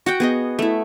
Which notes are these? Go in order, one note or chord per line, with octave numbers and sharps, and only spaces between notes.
F#4 F#5 G5
B3 G#4 D#5
A3 E4